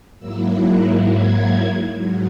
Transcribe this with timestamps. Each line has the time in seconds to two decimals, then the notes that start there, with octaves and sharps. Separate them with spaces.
0.19 G#2 F#3 A#3 E4 E6
0.64 F#6
1.08 G#6
1.97 G#2 F#3